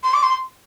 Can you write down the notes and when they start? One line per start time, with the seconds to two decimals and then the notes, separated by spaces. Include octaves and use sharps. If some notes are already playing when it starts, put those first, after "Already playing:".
0.04 C6
0.14 D6
0.23 C6